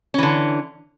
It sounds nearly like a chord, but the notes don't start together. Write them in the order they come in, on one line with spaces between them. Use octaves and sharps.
C#4 E3 D3